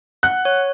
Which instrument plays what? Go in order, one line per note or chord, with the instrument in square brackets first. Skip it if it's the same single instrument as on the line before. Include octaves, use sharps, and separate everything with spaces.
[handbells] F#5 [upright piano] F#6
[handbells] C#5